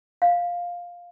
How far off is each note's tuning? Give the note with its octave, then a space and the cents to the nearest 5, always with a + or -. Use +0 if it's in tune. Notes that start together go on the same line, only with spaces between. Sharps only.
F5 +5